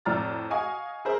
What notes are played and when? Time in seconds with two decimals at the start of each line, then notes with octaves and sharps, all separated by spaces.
0.05 F2 A2 D5 A#5 F6 A6
0.50 D#5 F5 F#5 G#5 C#6 D#6
1.05 G#4 A#4 C5 E5